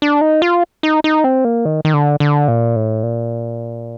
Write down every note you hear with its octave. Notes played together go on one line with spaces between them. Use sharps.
D4
D#4
F4
D#4
D#4
C4
A#3
D#3
D#3
D3
D3
A#2
A2
A#2